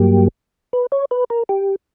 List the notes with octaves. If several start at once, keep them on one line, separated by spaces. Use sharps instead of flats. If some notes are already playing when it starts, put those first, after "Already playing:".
Already playing: G2 F#3 A#3 G4
B4
C#5
B4
A#4
G4